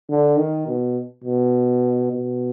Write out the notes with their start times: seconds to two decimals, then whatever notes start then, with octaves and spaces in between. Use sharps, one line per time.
0.10 D3
0.38 D#3
0.67 B2
1.24 B2
2.12 B2